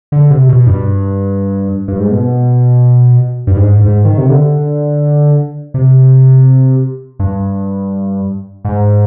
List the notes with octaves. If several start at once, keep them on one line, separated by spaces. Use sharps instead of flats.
D3
C3
B2
G2
G2
G#2
B2
G2
G#2
G#2
D#3
C3
D3
C3
G2
G#2